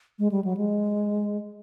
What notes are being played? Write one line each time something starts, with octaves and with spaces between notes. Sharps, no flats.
G#3
G3
F#3
G#3